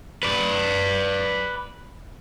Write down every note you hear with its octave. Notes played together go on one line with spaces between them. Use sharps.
B4 D5